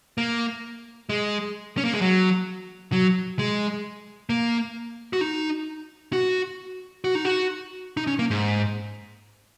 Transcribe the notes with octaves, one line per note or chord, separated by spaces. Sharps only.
A#3
G#3
C#4
A#3
G#3
F#3
F#3
G#3
A#3
F#4
D#4
F#4
F#4
D#4
F#4
D#4
C#4
A#3
G#2